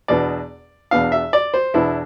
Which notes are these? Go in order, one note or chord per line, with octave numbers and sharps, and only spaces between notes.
E2 B2 B3 D4 D5
E2 B2 B3 D4 F5
E5
D5
C5
E2 B2 B3 D4 E4